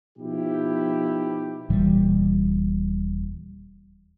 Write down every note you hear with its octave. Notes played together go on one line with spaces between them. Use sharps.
B2 F3 D#4 E4 G4
D#1 A#2 E3 G3